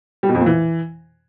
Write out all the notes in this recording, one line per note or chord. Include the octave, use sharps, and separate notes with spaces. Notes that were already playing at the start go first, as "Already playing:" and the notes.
G3
B2
F2
A#2
E3